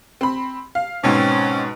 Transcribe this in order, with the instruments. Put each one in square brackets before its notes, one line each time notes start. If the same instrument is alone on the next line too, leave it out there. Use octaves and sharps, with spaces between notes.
[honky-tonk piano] C4 B5
F5
[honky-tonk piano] G#2 B2 [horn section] C4 C#4